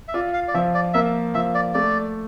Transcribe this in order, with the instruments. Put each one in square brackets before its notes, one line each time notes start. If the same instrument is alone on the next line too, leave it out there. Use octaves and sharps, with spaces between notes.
[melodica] E5
[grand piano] F4 [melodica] D5
[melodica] F5
D5
[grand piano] F3 [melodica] E5
[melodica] D5
[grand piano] A#3 [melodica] E5
[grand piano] F3 [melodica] E5
[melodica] D5
[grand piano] A3 [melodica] D5